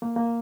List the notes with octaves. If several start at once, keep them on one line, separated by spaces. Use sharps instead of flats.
A#3
A#3